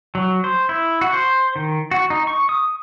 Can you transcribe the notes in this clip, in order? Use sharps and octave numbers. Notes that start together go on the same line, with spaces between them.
F#3
C5
E4
F#4
C5
D#3
F#4
D#4
C#6
D#6